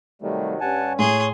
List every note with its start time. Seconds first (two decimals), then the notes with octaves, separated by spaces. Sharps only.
0.22 C3 D#3 F#3 G3 A3
0.61 G2 C#4 F#5 G#5 A5
0.99 A2 G#4 C#5 C6